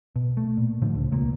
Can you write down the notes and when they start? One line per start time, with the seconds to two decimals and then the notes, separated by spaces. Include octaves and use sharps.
0.16 B2
0.37 A3
0.57 A#2
0.82 A2 D3 F3
0.95 C#2
1.12 E1 C#2 A#2 A#3